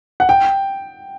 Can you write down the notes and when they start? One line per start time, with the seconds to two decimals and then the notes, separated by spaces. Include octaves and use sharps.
0.20 F#5
0.29 G5